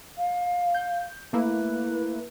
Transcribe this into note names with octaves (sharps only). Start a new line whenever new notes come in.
F5
G6
A3 A#3 E4 B4